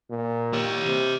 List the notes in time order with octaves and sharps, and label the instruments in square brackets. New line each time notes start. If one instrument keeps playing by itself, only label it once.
[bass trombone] A#2
[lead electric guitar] G4 C#5
[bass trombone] C3